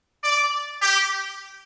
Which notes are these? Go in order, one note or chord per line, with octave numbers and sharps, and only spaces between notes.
D5
G4